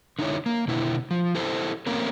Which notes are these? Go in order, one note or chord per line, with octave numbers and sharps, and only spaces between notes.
D3 D#4 E4 C#5
A#3
B2 D3 E4
F3
E4 G4 A4 C5
A3 A#3 C4 C#4 A#4